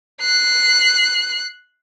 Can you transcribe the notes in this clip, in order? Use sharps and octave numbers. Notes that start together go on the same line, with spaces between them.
F#6 C7